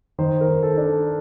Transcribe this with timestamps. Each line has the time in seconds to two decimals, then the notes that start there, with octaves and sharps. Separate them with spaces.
0.19 D#3 C5
0.41 A#4
0.48 D#3
0.63 A4
0.78 D4
0.85 A4